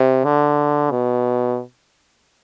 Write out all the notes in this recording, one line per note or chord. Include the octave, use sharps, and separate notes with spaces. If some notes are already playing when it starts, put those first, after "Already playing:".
Already playing: C3
D3
B2